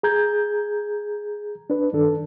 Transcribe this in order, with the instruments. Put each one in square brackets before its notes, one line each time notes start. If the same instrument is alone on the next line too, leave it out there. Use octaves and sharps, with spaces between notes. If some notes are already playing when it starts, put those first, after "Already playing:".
[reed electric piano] G#4 A#5 G6 G#6
D4 B4
G2 D#3 D4 A4